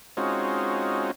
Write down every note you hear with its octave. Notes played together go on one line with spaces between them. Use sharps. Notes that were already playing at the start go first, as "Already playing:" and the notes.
G#3 C4 C#4 D#4 F4 F#4